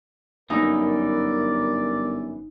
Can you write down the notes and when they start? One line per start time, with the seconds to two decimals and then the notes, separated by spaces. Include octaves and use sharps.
0.50 G1 F#2 E3 D#4 E4 A#4 D5